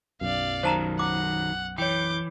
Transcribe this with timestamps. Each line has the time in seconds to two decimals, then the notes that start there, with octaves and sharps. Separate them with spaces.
0.21 B1 F#2 D5 F5
0.63 D#3 F#3 C5 A5 A#5
0.99 F#5 D6
1.78 E3 C#5 G5 D6 G6